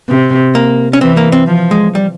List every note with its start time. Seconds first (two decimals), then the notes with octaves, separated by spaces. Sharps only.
0.09 C3
0.55 A#3
0.93 C#4
1.01 E3 C4
1.17 A#3
1.32 C4
1.47 F3
1.71 G#3
1.95 G3